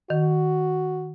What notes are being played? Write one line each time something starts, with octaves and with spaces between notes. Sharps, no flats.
D#3 F#4